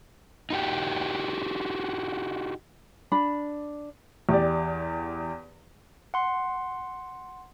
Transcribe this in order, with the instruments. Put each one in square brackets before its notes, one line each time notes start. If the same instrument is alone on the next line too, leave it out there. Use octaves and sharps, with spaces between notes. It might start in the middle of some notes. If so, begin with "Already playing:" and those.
[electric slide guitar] D#4 F#4 G4
[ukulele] D4 B5
[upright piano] E2 G4 D5
[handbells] F#5 C6